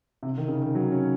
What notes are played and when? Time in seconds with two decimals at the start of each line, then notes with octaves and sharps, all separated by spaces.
0.23 C3
0.38 D#3
0.48 C#3
0.62 D#3
0.75 F#3
0.92 C#4